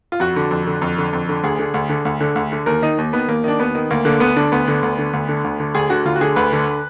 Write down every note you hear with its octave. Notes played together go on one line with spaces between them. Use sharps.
F4
F2 F#4
D3
F2
D3
F2
D3
F2
D3
D2 G#4
D3
D2
D3
D2
D3
D2
D3
D#2 A#4
D#3 D#4
D#2
D#3 B3
D#2 A#3
D#3 D4
D#2 B3
D#3
D2 A#3
D3 A#3
D2 B3
D3 D4
D2 B3
D3
D2
D3
D2
D3
D2
D3
D2 G#4
D3 F#4
D2 F4
F#4
D3 G#4
D2 B4
D3